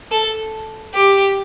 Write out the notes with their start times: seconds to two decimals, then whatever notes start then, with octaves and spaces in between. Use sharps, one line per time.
0.12 A4
0.94 G4